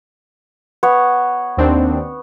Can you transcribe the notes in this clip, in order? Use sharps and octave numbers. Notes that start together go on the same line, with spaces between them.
B3 C#5
D#2 C4 D4